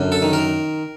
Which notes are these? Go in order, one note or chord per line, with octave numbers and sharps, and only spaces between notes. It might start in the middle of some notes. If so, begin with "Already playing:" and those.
Already playing: F#2 D3
A4
D#3
A#4